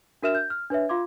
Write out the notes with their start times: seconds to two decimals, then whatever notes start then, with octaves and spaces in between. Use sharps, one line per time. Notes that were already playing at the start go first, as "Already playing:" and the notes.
0.23 D4 F#4 A#4 E5 F6 E7
0.35 G6
0.50 F6
0.70 D4 B4 C#5 E5
0.89 F4 F5 C6 D6 G#6